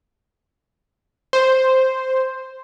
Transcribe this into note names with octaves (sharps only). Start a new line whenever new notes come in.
C5